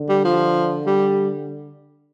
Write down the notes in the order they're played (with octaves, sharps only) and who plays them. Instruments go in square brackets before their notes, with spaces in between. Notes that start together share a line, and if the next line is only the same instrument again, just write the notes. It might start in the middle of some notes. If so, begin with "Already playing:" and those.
Already playing: [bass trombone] D3
[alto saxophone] G3
F3
G3